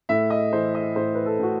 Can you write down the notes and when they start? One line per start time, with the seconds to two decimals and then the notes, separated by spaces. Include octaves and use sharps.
0.09 A2 E5
0.30 D#5
0.53 E3 C5
0.75 D#5
0.96 A2 C5
1.15 B4
1.26 A4
1.39 A2 F#4